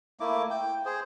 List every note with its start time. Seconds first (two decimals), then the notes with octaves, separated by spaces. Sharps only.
0.20 A3 A#3 E4 D6
0.50 G5
0.86 G#4 C5